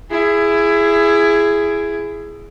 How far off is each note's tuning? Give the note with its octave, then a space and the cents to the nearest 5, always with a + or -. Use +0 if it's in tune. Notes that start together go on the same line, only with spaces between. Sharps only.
E4 +20 G#4 +0